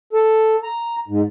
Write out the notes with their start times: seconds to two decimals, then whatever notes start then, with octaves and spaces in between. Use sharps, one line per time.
0.13 A4
0.64 A#5
1.08 G#2